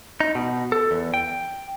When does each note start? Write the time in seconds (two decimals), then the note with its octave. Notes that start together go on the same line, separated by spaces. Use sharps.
0.20 D#4
0.35 B2
0.72 A4
0.91 E2
1.14 G5